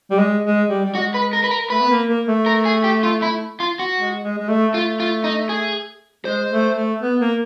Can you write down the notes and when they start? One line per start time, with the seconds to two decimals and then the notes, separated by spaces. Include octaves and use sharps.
0.11 G3
0.19 G#3
0.45 G#3
0.69 G3
0.84 G3
0.95 G#3 F#4
1.14 B4
1.33 A#4
1.44 B4
1.51 A#4
1.70 A3 B4
1.80 B3
1.90 A#3
2.08 A#3
2.28 A3
2.46 A#4
2.66 G#4
2.84 G4
3.03 F4
3.22 E4
3.60 F4
3.79 F#4
3.98 G#3
4.23 G#3
4.38 G#3
4.48 A3
4.74 A3 F4
5.00 F4
5.24 D#4
5.49 G#4
6.25 G#3 C5
6.50 A3
6.76 A3
7.02 B3
7.20 A#3